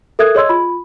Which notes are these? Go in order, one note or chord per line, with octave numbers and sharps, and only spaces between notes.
A4 A#4 E5 D#6 F#6 G#6
G#4 C#5 D#5 C6 E6 G#6
F4 B5